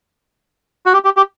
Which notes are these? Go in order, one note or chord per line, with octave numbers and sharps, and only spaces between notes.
F#4
G4
G4
G4